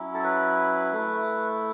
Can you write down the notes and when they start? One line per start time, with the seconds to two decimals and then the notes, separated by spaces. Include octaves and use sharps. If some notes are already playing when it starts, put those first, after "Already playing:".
Already playing: F#3 C#4 E4
0.14 A4
0.24 B4
0.93 A3 E4